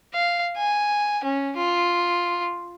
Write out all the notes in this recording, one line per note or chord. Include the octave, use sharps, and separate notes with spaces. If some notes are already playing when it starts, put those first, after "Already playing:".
F5
G#5
C#4
F4